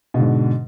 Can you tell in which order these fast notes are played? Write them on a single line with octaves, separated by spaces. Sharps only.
B2 D3 G#2